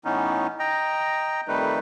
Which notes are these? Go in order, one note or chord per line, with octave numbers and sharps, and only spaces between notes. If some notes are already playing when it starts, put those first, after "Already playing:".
A2 E3 B3 C#4 D#4
D#5 G5 A#5
F2 D#3 G3 A3 D#4 B4